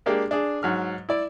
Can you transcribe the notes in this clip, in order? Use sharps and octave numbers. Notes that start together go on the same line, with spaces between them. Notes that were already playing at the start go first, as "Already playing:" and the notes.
G#3 A#3 D4 G4 G#4
D4 G#4
G#2 F#3 F6
E4 D5